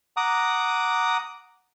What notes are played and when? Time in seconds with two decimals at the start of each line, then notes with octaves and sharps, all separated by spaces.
0.17 F#5 A#5 D6 D#6